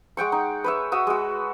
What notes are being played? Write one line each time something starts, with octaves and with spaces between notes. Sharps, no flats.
G#3 F#5 G5 C#6
D#4
B4 C#5 E5
F#4 E5 D#6
G#3 F#4